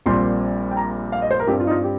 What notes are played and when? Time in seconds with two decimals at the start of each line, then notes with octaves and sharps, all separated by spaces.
0.06 A#1 A#2 G3 C4 C6
0.71 G5
0.77 A#5
1.12 F5
1.22 D#5
1.31 C5
1.40 A#4
1.47 G2 G3 C4 G4
1.60 F4
1.67 D#4
1.71 F4
1.84 G4